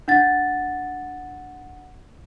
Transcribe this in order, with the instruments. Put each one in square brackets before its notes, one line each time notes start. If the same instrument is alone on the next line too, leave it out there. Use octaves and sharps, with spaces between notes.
[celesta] D4 F#5 A6